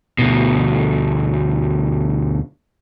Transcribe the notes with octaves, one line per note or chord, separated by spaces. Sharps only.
D2 B2